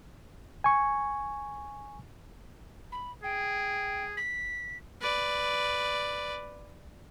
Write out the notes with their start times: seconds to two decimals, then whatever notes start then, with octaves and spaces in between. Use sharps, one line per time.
0.64 G#5 C#6
2.92 B5
3.24 G#4 G5
4.17 B6
5.01 B4 D5